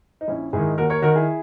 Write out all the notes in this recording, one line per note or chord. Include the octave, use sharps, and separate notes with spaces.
D#4
A#1 C#4 E4
G#2 D#3 E4 G#4
D#2 F#4 A#4
A#4 C#5
D#3 F#4 A#4
E4 G#4